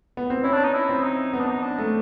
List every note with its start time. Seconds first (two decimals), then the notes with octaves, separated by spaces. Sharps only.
0.17 B3
0.30 C4
0.44 C#4 E4
0.53 D4
0.64 D#4
0.74 E4
0.89 C4
1.03 D#4
1.33 B3 D#4
1.40 D4
1.48 D#4
1.63 D4
1.78 A3